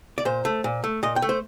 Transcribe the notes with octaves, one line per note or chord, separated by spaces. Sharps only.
D5
A#2 C5
A3
A#2
A3
A#2 D#5
G5
A3
C5